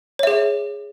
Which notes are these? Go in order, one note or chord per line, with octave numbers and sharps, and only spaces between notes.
G#4 C#5 E5